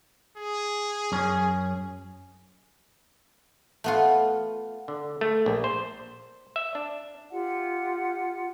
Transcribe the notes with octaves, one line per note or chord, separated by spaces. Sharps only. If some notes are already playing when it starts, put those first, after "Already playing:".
G#4
F#2 C#4
A3 B3 F4
D3
A3
A#1
C5
E5
D4
F4 G4 F#5